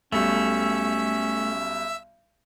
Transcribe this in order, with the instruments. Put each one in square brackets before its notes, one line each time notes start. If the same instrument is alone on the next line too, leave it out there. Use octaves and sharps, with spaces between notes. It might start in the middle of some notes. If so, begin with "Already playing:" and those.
[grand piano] B1 B2 G3 [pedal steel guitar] A3 [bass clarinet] C#4 [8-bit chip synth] E5 E6